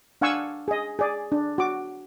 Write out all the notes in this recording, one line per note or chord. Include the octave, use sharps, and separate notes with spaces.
D4 F5 F#5 G#5 C#6 E6
G#4 D#5
G#4 D5
D4
F#4 D6